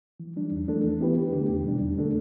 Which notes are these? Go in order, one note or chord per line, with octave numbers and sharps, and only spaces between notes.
E3
G3 D4
E2
E3 A3 D4 A4
E3
B3 E4 G4 B4
D2
D3 A3 D4 G4
E2
B2 G3 D4
E2
D3 A3 D4 A4